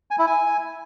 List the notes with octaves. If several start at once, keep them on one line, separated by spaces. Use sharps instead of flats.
G#5
E4
G#5